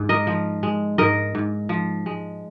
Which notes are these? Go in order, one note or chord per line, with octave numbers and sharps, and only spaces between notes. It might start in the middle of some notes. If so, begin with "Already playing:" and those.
Already playing: G#2
A#4 D#5
F3
G#3
G#2 A#4 D#5
G#2
F3
G#3